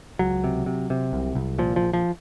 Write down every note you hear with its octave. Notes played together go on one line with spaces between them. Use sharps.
C#2 F#3
C3
C3
C3
C2
C2
A#2 F3
F3
A#1
F3